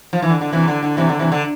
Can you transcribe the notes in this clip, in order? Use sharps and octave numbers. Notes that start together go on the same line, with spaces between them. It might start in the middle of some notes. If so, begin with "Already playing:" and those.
F3
E3
D3
D3
C3 E3
D3
D3
C3 E3
D3
C3 E3
D3